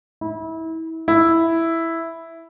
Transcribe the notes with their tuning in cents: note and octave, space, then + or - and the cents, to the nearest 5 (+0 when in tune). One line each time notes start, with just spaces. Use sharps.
E4 -30
E4 +0